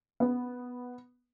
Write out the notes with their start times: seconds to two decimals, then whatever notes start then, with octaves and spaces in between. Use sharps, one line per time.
0.20 B3